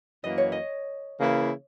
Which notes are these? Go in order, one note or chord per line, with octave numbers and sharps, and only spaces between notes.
F#2 E3 A#3 D#5
C#5
D#5
C#3 E3 A#3 E4